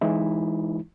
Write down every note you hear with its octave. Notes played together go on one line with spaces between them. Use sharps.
E3 G#3 D#4 E4